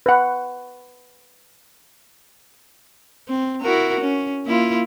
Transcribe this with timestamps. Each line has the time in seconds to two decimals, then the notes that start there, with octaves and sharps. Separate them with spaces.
0.06 B4 F#5
3.28 C4
3.61 E4 F#4 A#4
4.00 C#4
4.45 A#3 E4 F4